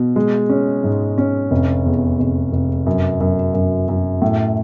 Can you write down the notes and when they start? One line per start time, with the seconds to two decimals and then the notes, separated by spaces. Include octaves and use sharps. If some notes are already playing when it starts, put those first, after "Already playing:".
Already playing: B2
0.16 G#3
0.49 C#4
0.84 G#2
1.18 C#4
1.51 F1
1.85 E2
2.19 F1
2.53 F1
2.86 F#2
3.20 F#2
3.54 F#2
3.88 F#2
4.22 A2